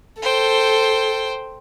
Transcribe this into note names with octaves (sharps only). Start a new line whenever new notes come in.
A4 C5 G5